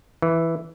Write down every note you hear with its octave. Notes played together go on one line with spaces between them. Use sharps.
E3